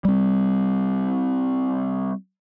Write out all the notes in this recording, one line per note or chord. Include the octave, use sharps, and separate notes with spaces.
G3 C4